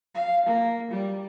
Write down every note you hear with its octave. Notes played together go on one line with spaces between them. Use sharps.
F5
A#3
G3